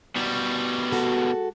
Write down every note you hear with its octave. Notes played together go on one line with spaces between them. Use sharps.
B2 G3
G#3 F#4 A4